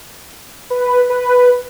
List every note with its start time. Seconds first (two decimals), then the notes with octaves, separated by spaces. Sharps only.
0.70 B4
1.10 B4